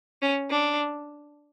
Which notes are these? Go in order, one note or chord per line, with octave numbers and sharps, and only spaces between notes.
C#4
D4